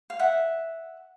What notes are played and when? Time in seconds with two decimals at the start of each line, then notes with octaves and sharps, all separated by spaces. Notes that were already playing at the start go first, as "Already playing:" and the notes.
0.10 F5
0.19 E5 F#5